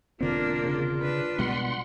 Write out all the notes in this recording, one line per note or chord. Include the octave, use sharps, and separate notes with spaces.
E1 D3 A#3 C4 D4 F4
C#3
D4 B4
B2 G3 G#3 F#5 C6